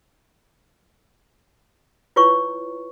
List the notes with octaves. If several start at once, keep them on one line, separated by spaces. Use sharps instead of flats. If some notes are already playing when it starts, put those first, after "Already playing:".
E4 F4 B4 C#5 A#5 C#6